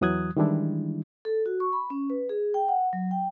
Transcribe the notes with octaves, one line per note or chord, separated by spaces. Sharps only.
E2 E3 F#3 D#6 F#6 G#6
D#3 E3 G3 G#3 D4 E4
A4
F#4
C#6
B5
C#4
B4
G#4
G5
F#5
F#3
G5